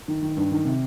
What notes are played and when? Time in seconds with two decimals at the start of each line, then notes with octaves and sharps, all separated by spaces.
0.08 D#3
0.22 D#3
0.37 G2
0.51 D#3
0.65 C3